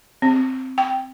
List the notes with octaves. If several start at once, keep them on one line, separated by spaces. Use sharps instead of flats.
C4
G5